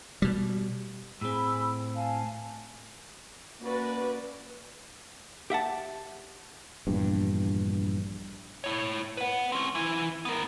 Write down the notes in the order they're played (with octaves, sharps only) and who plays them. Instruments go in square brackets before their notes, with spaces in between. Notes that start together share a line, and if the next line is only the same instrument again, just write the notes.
[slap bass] B2 G3
[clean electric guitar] A2 C4 [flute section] G#4 B5 E6
[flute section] F5 G#5 A5
[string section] A#3 C#4 F#4 B4 D5
[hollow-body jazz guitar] G4 E5 F#5 A5
[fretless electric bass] A#1 E2 G2
[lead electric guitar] E4 C#5
B4 F#5
C4 C#4
E3 E4
B3 A#4